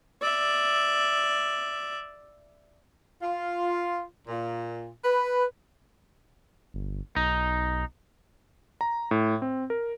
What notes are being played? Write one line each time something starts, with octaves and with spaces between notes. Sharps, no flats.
D5 E5
F4
A#2
B4
G1
B1 D#4
A#5
A2
C4
A#4